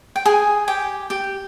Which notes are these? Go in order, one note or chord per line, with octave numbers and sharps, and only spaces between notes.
G5
G#4 G#5
G4 G5
G4 G5